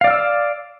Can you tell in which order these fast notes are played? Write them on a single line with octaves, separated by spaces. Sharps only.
F5 D5 F6 E6